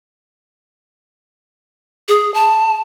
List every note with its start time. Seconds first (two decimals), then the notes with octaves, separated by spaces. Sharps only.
2.08 G#4
2.34 A5